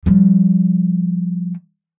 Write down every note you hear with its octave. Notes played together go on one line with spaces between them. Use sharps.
F3 G3